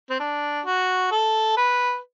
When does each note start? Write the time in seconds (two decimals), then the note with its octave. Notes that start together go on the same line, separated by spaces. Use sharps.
0.10 C4
0.20 D4
0.66 F#4
1.11 A4
1.57 B4